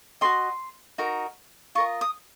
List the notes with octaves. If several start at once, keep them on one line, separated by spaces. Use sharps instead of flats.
F#4 A#4 D#5 C6
D#4 F#4 A#4
F4 A#4 D#5 C#6
D#6